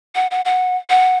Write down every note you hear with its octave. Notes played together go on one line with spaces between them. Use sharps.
F#5
F#5
F#5
F#5